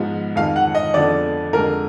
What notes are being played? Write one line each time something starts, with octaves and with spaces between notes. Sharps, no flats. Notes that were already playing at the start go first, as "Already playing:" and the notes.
Already playing: G#2 F3 G#3 B3
F2 D#3 G#3 F5
F#5
D#5
F2 D3 F3 G#3 B3 D5
F2 D3 G#3 A#4